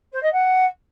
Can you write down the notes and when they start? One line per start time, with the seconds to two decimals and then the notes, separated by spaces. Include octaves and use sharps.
0.12 C5
0.22 D#5
0.32 F#5